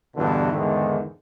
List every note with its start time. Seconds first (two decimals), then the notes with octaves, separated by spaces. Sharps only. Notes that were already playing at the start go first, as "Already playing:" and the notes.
0.16 E2 G2 B2 D3 E3
0.52 E2 G#2 D3 D#3